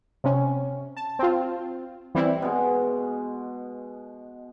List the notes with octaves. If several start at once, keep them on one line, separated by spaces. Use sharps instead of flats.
C3 C#4
A5
C4 F4
E3 G3 C4 E4
B2 G#3